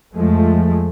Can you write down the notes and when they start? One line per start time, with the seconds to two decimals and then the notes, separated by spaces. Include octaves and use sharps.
0.15 F2 F3 G#3 A3